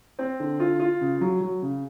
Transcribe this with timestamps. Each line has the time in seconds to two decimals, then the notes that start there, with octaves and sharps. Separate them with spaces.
0.19 C4
0.40 D3
0.60 F4
0.80 F4
1.01 C#3
1.21 F#3
1.41 F#3
1.62 C#3